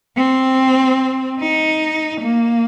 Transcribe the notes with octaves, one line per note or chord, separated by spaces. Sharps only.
C4
D#4
A#3